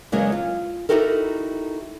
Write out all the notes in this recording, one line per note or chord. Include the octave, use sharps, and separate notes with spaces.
E2 C#3 F#3 G#3 A#3
F4
D#4 E4 F#4 G4 A4 A#4